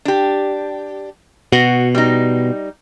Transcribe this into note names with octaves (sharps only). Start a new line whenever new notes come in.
D4 G4
B2 F#4
G3 D#4